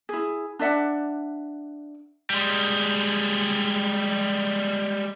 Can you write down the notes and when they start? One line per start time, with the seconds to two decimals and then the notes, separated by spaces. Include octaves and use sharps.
0.09 E4 G#4
0.59 D4 D5 E5 F#5
2.30 G3 G#3